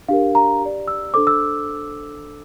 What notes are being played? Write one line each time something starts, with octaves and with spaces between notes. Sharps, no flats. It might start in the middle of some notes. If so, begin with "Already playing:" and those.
D4 G4 A#4 F5
A#5
G4 D5
E6
D4 A4 C5 D6
E6